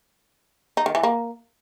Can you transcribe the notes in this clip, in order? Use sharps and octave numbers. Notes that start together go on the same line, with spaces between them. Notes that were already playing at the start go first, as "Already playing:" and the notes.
D#4
D#3
E3
A#3